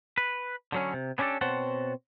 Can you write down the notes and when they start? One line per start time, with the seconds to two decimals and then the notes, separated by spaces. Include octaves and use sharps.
0.18 B4
0.72 D3 F#3 C#4
0.94 C3
1.18 B3 C#4 D4 E4 G4 A4
1.41 B2 C4 C5 C#5 F#5 A5